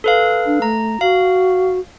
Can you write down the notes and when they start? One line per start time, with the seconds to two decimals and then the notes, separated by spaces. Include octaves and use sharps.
0.04 A4 B4 F5
0.46 D4
0.62 A3 A#5
1.01 F#4 F5